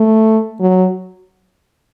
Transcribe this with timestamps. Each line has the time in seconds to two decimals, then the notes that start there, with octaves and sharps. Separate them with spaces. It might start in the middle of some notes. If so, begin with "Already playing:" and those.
Already playing: A3
0.60 F#3